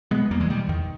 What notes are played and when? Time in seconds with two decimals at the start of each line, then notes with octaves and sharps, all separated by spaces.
0.11 B2 G#3 B3
0.31 E2 G3 A#3
0.40 E3 G#3
0.50 B2 D#3 G3
0.69 E2 D#3